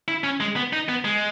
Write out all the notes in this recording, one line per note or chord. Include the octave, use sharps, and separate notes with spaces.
E4
C#4
G#3
B3
D#4
B3
G#3